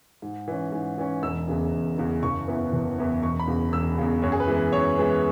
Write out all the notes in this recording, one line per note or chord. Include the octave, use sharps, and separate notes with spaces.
G#2
E3 C#4
G#2
E3 C#4
E1 E6
E2 C#3 E3
E1
E2 C#3 E3
F#1 C#6
E2 E3 B3 E4
F#1
E2 E3 B3 E4
E1 C#6
B5
E2 C#3
E1 E6
E2 C#3
F#2 C#5
G#4
B4
E3 G#3 B3
B4
F#2 C#5
E3 G#3 B3